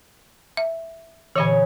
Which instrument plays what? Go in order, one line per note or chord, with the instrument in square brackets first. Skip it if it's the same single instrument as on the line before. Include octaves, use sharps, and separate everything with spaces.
[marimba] E5
[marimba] A#2 D3 E3 [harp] C#5 D#5 G#5